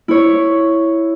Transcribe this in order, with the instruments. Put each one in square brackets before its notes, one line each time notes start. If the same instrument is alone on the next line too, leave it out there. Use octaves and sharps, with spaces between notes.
[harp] E4 C#5